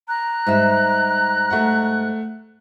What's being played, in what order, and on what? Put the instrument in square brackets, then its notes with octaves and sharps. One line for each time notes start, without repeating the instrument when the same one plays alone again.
[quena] A#5 [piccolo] F#6
[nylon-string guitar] G#2 G3 E5
[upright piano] A3 F#5